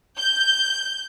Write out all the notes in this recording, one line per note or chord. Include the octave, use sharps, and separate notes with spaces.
G6